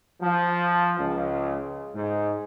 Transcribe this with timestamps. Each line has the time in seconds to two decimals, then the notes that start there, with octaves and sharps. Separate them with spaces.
0.22 F3
0.99 C#2
1.93 G#2